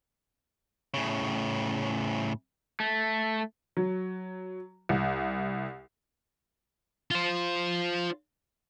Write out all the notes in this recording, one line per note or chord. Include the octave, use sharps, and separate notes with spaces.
A2 C#3
A3
F#3
C2
F4 C5